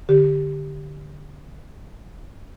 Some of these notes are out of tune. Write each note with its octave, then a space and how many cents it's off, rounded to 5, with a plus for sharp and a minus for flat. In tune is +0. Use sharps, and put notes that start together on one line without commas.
D3 +0 G4 +0